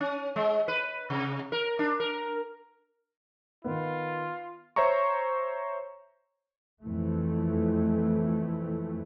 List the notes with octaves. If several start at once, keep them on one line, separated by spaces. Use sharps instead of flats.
C#4
G#3
B4
C3
A#4
D4
A#4
D#3 B3 F4
C5 C#5 E5 A#5 C#6
F2 E3 A3